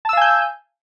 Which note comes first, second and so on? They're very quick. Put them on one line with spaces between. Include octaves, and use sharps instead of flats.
A5 E6 F5 G#5 G6